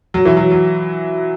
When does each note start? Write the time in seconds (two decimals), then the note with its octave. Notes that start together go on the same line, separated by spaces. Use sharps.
0.14 F#3
0.25 E3
0.37 F#3
0.51 F#3